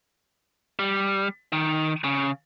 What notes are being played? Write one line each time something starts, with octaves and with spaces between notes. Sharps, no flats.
G3
D#3
C#3